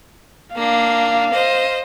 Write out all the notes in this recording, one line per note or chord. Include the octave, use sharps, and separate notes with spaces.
A#3 D4 F5
C5 D#5